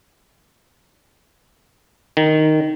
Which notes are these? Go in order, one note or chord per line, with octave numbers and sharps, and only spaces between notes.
D#3